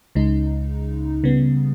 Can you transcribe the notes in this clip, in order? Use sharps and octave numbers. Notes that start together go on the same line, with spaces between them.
C#2 C#3 G#3 D#4
C#3 G3 B3